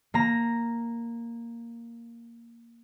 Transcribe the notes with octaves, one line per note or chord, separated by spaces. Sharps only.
A#3 A#5